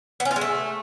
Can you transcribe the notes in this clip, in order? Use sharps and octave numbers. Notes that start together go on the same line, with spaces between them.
B3
C#4
F4
G#3
A3